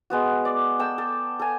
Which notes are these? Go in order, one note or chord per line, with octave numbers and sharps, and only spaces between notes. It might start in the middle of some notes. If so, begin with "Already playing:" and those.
G#3 B3 F#4
D5
A4 G5 E6
A4
A4 G#5